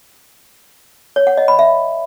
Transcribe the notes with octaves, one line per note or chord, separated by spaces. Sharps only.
C#5
F#5
D#5
B5
E5